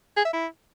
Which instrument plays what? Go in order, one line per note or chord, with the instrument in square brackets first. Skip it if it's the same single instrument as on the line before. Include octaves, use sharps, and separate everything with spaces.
[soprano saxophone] G#4
E5
E4